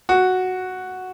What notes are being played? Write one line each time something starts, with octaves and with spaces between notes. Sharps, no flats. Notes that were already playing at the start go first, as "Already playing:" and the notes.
F#4